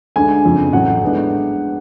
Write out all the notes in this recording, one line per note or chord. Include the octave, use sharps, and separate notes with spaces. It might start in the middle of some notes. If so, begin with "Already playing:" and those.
D2 D3 G#3 D4 G#5
F#1 F2 C#3
A1 A2 F#3 A3 D4 F#5
A2 G#3 B3 D4